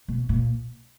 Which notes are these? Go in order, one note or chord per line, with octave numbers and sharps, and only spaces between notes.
B2
A#2